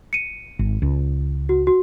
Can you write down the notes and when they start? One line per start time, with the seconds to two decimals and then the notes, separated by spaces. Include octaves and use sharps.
0.13 C#7 D#7
0.59 G#1
0.82 C#2
1.49 F#4
1.67 F#4